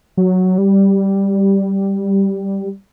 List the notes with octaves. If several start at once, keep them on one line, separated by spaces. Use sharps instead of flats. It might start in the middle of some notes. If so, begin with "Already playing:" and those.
F#3
G3